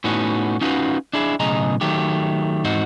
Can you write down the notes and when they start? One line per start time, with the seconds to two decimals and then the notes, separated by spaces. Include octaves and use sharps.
0.04 A2 B3 C#4 D#4 F#4
0.61 C#4 D#4 F4 F#4 A#4 B4
1.13 D4 E4 G#4
1.40 B1 A2 C#3 G#4 D#5 A#5
1.81 D#3 F#3 A3 G4
2.64 E2 G#2 C4 D#4 F#4